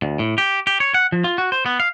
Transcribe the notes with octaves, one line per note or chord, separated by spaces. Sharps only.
D2
A2
G4
G4
C#5
F#5
F3
F4
F#4
C5
B3
F5